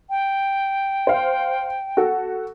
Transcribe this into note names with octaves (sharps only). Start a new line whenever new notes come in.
G5
C5 F5
F#4 A4